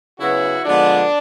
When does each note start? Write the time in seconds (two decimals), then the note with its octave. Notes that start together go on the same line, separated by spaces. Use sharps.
0.19 C#3 F#3 B3 E4 F#4
0.64 D3 F3 G#3 B3 D4